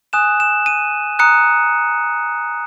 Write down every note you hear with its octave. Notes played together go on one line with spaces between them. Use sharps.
G#5 D#6 F#6 E7
E7
D#7
A#5 D#6 F#6 C#7